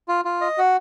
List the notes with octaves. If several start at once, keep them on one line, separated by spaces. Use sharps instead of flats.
F4
F4
D#5
F#4